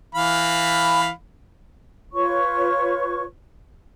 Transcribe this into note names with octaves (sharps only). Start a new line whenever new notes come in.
E3 F5 B5
F4 B4 C#5 C#6